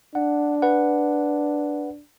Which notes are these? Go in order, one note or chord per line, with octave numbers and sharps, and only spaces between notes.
D4 F#5
B4 F#5